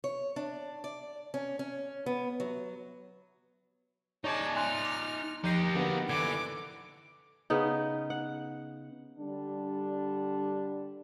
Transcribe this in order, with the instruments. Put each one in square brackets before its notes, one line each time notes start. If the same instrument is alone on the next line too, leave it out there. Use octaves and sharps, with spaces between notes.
[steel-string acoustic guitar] C#5
D4
D5
C#4
C#4
B3
F#3
[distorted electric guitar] D#4 D5 [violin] G#4 A5 [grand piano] C#5 G#6
[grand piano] G#5 C6 F#6 [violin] F6
[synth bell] D6
[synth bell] F3 G6 C7 [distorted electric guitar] D#4 G4
[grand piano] D3 A#3 B3 [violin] F#4
[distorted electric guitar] D3 E3 [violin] D6 [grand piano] G#6 [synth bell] C#7
[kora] C#3 B3 D#4
F#5
[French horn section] D3 G3 D4